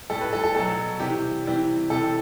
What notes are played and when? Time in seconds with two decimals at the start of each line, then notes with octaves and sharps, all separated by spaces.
0.10 A2 G3 A4
0.21 B4
0.33 A4
0.44 A4
0.55 B2 F#3 A4
1.00 C3 E3 G3 G4
1.45 C3 E3 G3
1.90 C3 E3 G3 A4